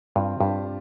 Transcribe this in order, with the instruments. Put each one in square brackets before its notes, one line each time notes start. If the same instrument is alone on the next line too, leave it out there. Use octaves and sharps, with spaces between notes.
[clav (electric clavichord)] G2 [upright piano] C4 F4
[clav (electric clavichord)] G2 [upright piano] D4 G4